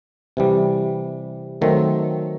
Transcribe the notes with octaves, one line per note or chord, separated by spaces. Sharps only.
C3 E3 G3
D#3 F#3 A3 C4